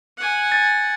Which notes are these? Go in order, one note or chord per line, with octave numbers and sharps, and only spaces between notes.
F#5 G#5
A6